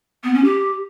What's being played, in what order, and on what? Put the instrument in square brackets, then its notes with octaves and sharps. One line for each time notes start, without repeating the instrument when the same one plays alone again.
[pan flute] B3
C#4
G4